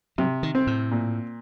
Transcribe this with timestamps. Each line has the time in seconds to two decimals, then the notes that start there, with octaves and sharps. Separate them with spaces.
0.18 C3 F#3
0.43 D#3
0.55 C4
0.67 A2
0.91 A#2